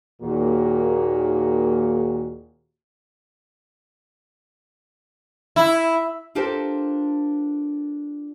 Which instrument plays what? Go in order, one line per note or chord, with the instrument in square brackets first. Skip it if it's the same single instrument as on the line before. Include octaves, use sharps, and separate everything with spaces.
[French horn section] D#2 A#2 D#3 A#3 F#4 G#4
[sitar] E4
[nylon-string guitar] D4 F4 G4 A4 A#4 C5